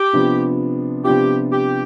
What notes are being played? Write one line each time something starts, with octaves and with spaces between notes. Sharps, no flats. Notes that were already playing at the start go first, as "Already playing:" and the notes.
Already playing: G4
C3 F3 B3 D4 F4
C3 F3 B3 D4 F4 G4
G4